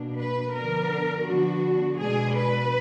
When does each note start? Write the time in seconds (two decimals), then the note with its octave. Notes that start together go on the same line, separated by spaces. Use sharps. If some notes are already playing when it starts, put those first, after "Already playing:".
Already playing: B2 A#3 D4
0.17 B4
0.53 D3 F3 B3 D4 A#4
1.26 D3 F3 B3 D4 F#4
1.98 B2 G#3 D4 G#4
2.35 B4